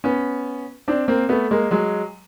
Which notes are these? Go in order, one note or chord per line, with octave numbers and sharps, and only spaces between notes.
B3 C#4
C4 D4
A#3 C4
A3 B3
G#3 A#3
F#3 G#3